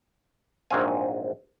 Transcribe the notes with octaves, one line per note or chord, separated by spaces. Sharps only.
A#1 G#2 F#3 C4 F5 G#5